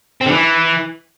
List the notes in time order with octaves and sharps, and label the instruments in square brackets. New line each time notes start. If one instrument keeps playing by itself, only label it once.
[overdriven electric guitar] C4
D3
E3